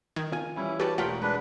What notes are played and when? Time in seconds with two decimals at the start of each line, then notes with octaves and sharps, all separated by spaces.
0.16 D#3 G#6
0.32 F4 G#5
0.56 E3 G3 C#4 E4
0.80 F#4 G4 B4 D5 A5
0.98 E1 A3 F4 G4 A#4 F#5 G5 B6
1.22 G#3 D4 B4